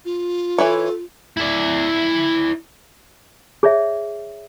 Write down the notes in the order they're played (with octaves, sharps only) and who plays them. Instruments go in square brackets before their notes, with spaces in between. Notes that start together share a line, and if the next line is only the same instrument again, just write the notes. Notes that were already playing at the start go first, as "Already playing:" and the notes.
[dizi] F4
[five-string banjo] E3 E4 C#5 [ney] A4
[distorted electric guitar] E4 D5
[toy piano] G#4 C#5 D5 E5